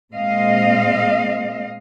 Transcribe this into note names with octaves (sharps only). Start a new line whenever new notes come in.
A#2 G#3 C4 D#5 F5